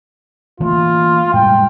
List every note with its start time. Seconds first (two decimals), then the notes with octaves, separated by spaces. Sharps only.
0.60 E3 A3 A#3 F4
1.34 A2 G3 G#3 G5